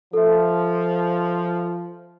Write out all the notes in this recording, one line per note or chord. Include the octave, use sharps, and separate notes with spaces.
F3 A4 E5